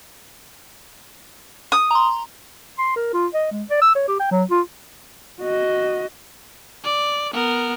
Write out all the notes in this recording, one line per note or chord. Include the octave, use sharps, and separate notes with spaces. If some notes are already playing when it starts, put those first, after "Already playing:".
D#6
A#5 C6
C6
A#4
F4
D#5
G#3
D5
E6
C#5
G4
G5
F#3
F4
F#4 D#5
D5
B3 A#4